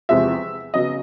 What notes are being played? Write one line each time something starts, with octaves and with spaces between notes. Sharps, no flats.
E2 C3 F3 G#3 C4 E5
C#3 F#3 B3 D#5